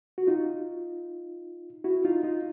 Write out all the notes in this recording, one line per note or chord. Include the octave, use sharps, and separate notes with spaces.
F#4
D#4 F4
E4 F#4
D#4 F4
D#4 F4